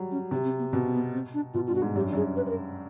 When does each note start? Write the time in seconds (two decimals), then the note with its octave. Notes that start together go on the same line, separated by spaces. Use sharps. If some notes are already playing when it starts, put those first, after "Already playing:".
Already playing: F#3 G3
0.11 C#4
0.31 C3 C4
0.45 C4
0.59 B3
0.72 B2 C4
0.86 C4
0.93 B3
1.13 C4
1.34 D4
1.54 B2 F4
1.67 G2 F4
1.75 F#4
1.82 G#2
1.95 F#2 G4
2.04 G2
2.13 F#2 G#4
2.36 B4
2.46 B4
2.50 A#4